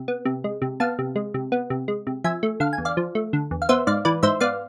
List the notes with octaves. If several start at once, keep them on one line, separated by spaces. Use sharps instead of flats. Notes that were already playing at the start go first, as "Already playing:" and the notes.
Already playing: C3
B3
C3
G#3
C3
B3 F5 A5
C3
G#3
C3
B3
C3
G#3
C3
F3 E5 G#5
A3
D3 F5
G#5
E2
D5 F5
F3
A3
D3
E2
F5
B3 C5 E5
G#2 D5 F5
E3 B4 D5
G#2 C5 E5
B3 D5 F5